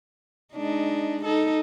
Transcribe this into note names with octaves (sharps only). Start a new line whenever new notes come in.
G#3 D4 D#4
D#4 A4